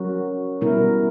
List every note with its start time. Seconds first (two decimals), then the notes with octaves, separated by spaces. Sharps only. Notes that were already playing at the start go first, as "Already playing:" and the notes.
Already playing: F#3 C#4 F#4 A#4
0.61 B2 G3 B3 E4 A#4